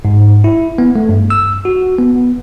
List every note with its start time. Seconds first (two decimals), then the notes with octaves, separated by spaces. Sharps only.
0.05 G#2
0.44 E4
0.78 B3
0.96 A3
1.09 G2
1.30 E6
1.65 F#4
1.98 B3